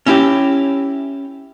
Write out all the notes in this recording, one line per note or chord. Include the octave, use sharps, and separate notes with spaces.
C#4 E4 G4